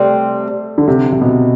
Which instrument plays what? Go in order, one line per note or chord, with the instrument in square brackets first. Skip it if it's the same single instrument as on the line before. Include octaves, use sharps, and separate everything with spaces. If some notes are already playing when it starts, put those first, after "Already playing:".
Already playing: [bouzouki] C3 G3 C4 [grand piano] A3
[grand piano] D3
C3
C3
B2